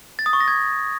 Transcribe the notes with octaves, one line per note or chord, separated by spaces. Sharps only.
A6
D#6
C#6
A#6
G#6